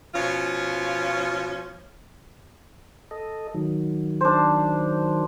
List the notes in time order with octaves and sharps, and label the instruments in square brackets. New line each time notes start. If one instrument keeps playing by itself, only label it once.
[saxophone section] B2 F3 C#4 F4
[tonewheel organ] A4 D#5
D#3 F#3
[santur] D4 C5